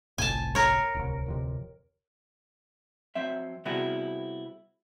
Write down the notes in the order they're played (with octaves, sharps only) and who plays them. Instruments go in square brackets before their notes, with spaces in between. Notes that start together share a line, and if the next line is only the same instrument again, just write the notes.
[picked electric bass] G1 C2 A2 [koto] G#5 A5
[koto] A#4 C#5
[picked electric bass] D1 C2
D1 F2 C3
[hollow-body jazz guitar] F2 F#3 C4 E5
C3 G3 B3 E4 F#4 G#4